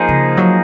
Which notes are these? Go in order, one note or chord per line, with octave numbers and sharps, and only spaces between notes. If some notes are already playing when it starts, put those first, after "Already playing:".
Already playing: F3 A#3 D#4 G#4 C5
C#3
F#3